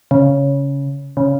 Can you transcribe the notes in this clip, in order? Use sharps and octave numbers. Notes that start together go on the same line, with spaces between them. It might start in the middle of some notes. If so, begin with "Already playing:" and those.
C#3
C#3